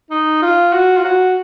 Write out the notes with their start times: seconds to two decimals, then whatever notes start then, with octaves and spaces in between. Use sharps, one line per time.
0.11 D#4
0.42 F4
0.73 F#4
0.97 F4
1.04 F#4